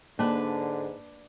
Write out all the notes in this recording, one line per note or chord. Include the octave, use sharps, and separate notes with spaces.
G#2 D3 A#3 D4 B4